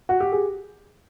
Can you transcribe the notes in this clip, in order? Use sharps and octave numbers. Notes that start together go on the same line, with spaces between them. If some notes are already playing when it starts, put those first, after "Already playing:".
F#4
G4
G#4